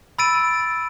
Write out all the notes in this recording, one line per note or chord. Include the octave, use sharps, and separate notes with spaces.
B5 E6 A6 D7 D#7